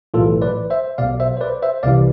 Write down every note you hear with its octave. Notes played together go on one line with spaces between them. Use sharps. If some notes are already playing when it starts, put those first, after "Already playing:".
B1 A2 E3 F4 A4
B4 D5
C5 E5
B1 B2 D5 F5
C5 E5
C5
B4 D5
C5 E5
C2 C3 E3 D5 F5